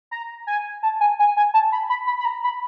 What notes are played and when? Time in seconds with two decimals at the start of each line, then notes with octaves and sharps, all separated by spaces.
0.11 A#5
0.47 G#5
0.83 A5
1.00 G#5
1.19 G#5
1.37 G#5
1.54 A5
1.72 B5
1.89 B5
2.07 B5
2.20 B5
2.25 A#5
2.44 B5